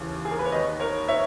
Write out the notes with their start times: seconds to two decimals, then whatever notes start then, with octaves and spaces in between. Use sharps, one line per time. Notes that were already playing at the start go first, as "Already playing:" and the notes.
Already playing: D#2 C#3 E3
0.25 G#4
0.31 A#4
0.39 B4
0.45 C#5
0.52 D#2 D#3 B4 D#5
0.80 A#4 C#5
1.08 C#5 E5